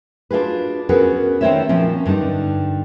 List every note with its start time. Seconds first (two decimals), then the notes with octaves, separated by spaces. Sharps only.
0.31 D4 F4 F#4 G#4 B4
0.89 B3 C#4 F#4 G#4 A#4 B4
1.41 D#3 B3 C4 C5 C#5 E5
1.69 A#2 F3 C4 C#4
2.06 G2 D3 G3 D#4